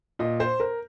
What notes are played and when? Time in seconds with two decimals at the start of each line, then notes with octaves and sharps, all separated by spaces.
0.19 A#2 D#5
0.40 C5
0.60 A#4